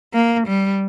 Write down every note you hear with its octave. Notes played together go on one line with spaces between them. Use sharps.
A#3
G3